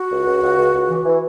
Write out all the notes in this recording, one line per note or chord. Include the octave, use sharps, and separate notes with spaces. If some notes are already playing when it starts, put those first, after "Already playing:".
Already playing: F#4
C#2
C#2
C#2
C#2
C#2
E3
E3